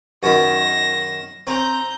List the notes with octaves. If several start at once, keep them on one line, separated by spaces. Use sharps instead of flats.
F#2 D#3 B5 A#6 E7
C4 C5 A#5 G6